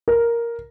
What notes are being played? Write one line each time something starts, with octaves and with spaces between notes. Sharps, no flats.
A#4